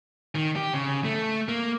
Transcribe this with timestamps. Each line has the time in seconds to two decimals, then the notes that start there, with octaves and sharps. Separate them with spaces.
0.35 D#3
0.56 G4
0.73 C#3
1.04 A3
1.48 A#3